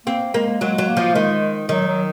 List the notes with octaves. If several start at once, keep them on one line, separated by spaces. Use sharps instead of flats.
A#3 C4
G#3 A#3
F#3 G#3
F#3
A#3
F3
D#3 G#3
D#3 F#3
F#3